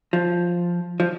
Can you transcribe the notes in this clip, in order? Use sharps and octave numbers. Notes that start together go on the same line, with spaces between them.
F3
F3